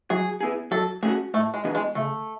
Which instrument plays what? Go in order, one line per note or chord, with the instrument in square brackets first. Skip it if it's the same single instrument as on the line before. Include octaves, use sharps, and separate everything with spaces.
[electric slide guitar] F#3 [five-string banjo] G#4
[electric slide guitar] B3 E4 G#4
[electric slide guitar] F#3 [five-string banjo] A4
[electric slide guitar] A3 C#4 F#4 [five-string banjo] G#4
[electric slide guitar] A2 [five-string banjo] A3
[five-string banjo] G#3
[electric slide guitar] E3 B3 D4 G#4
[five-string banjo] G#3
[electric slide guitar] C#3 [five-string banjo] A3